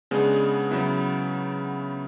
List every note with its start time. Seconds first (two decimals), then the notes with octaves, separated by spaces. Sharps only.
0.11 C#3 G#3 B3 D4 G#4
0.71 C#3 F#3 B3 E4